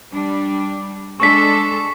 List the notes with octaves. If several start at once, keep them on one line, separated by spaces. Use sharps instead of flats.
G3 D4
G#3 D4 A4 C#6 B6